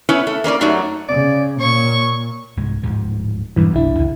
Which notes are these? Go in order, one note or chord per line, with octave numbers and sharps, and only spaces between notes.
B3 C#4 E4 B4 C#5
A3
A#3 C#4 B4 D5
F#2 F#3 A3 D#4 G4 D5
C#3 D5
A#2 C#5 C#6
C2 G#2 G#3
D1 G#2 F3
B1 E2 G2 E3
F#1 C2 B2 D4 E4
C#2